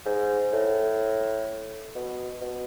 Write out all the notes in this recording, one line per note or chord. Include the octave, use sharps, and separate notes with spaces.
G#2
A2
B2
B2